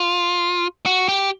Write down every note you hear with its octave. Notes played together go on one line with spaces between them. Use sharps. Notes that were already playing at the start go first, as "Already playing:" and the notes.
Already playing: F4
F#4
G4